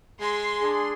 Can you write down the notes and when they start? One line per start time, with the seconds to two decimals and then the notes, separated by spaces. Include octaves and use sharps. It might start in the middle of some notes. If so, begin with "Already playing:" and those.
0.21 G#3 C6
0.60 D4 G#4